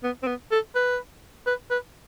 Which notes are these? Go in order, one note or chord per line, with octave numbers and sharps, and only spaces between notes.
B3
C4
B3
A4
B4
B4
B4